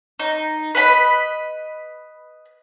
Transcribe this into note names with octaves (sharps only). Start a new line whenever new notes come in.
D#4
B4 D#5 B5